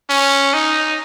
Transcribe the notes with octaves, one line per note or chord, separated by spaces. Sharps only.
C#4
D#4